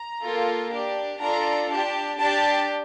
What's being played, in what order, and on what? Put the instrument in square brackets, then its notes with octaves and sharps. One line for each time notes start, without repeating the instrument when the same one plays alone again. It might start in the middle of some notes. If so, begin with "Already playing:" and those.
Already playing: [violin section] A#5
A#3 F4 A4
D4 G4
D4 F4 A4 A#5
D4 G4 A5
D4 G4 A5